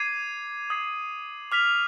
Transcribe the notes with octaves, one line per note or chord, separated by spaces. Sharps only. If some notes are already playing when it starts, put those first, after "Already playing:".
Already playing: D6 G#6 C7 D#7
D#6 G#6 C7
D6 F6 B6 F7